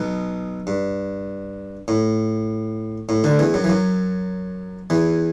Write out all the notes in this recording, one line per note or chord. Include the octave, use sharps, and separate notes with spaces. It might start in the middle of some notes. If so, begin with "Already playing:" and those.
Already playing: B1 B2
G2
A2
A2
D2 D3
E2 E3
F#2 F#3
E3
F#2 F#3
E2 E3